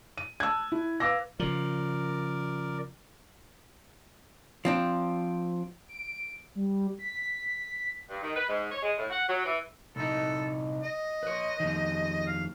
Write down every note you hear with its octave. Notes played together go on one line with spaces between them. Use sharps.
D#7
A5 E6 F#6 G#6
E4
B4 F5 D6 E6 A#6
C#3 F3 A#4 D5
F3 C4 D4
D7
G3
B6
G2
D#3
B4
G#2
C#5
G#3
A2
F#5
F#3
E3
C2 D#4 A4
D#5
B4 C#5
F2 D#3
F5